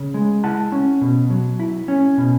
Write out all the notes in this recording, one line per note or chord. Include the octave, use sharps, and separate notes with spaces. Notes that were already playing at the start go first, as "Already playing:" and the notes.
Already playing: C#3
G#3
E4 F#5 A5
C#4
B2
F#3
E4
C#4
B2